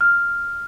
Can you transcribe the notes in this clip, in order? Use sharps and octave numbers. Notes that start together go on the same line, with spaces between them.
F6